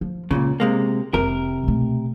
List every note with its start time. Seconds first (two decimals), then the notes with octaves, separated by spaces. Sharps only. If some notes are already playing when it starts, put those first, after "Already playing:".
0.01 F3
0.31 C#2 A#2 C#3 B3
0.60 C3 G#3 A#3
1.14 F1 C3 A#4
1.64 B2 A3